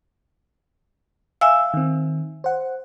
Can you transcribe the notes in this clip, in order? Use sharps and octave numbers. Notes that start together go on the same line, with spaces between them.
E5 F5 G#5 E6
D#3 C4
C5 F#5